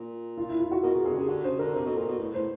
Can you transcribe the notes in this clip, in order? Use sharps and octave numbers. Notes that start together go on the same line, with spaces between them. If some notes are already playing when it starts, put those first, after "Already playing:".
Already playing: A#2
F4
E4
F4
F#4
B2 A#4
B2 G#4
C3 G#4
D3
C#3 G4
D3 F#4
C#3 C5
D3 A#4
C3 A#4
B2 A4
A#2 A#4
B2
A2 B4
A2 C5